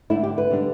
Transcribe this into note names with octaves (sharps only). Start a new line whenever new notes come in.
D3 A3 D4 E4
G4
B4
D3 G3 D4